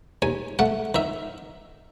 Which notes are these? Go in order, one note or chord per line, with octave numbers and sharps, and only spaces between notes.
D#2 G#5
A3 F#5
D#3 E5